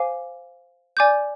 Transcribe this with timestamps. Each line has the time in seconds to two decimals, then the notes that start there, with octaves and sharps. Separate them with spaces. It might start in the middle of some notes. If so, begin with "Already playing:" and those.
Already playing: C5 F5 G#5 D6
0.97 D5 G#5 D6 G6